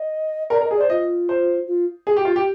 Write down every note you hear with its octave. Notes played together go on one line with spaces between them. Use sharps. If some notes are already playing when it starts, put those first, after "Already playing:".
Already playing: D#5
A#4 D5
A#4
D#5
G#4
C5 D5
F4 D#5
C5
F4
G#4
G4
F4
G4